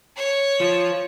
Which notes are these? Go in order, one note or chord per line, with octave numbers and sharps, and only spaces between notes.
C#5
F3